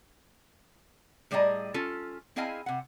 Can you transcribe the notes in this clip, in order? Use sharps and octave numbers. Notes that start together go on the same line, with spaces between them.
A2 G3 G#4 D5 D#5 A#5
C#4 F4 A4
C4 E4 G#4 D#5 F5 G#5
C3 F#5